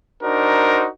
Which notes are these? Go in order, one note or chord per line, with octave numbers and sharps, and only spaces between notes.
D4 D#4 F#4 A#4 C5